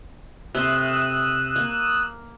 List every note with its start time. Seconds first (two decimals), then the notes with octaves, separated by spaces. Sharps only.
0.55 C3 A3 C6 D#6 E6 F#6
1.56 A#3